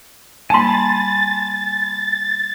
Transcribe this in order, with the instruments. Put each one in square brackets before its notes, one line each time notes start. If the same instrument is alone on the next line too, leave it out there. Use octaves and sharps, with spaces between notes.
[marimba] G3 A#3 [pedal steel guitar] G#5 B5 [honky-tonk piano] A5 C6 [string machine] A6